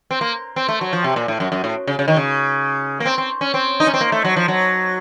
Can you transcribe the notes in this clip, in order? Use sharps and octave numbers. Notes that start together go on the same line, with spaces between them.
C4
A#3
C4
A3
F#3
F3
C3
A#2
A2
F#2
F#2
A2
C#3
C#3
D#3
C#3
A#3
C4
C4
C#4
C4
D#4
C#4
C4
A#3
A3
F#3
F3
F#3